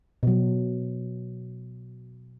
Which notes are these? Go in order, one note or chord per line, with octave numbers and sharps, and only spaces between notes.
B2 F#3